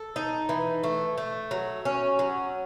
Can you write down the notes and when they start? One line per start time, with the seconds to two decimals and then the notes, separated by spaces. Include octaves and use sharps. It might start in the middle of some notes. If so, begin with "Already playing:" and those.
Already playing: A4
0.16 D#4
0.49 E3
0.84 A3
1.18 A3
1.51 F#3
1.85 C#4
2.19 F#3